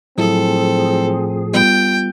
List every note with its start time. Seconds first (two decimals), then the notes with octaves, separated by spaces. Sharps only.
0.18 A2 F3 F#3 C4 E4 G#4 A4
1.53 G3 B3 F4 G5